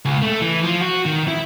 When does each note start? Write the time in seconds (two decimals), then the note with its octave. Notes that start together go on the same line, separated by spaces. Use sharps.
0.05 C#2
0.22 A3
0.42 E3
0.63 F3
0.81 F#4
1.05 D#3
1.28 E4